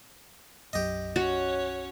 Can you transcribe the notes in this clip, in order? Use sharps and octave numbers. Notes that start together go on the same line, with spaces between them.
B1 F#2 F#3 G4 D#5
C#4 F#4 C#5